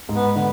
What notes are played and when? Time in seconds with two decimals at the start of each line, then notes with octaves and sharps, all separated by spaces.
0.09 G#2
0.16 B3
0.36 D3 B3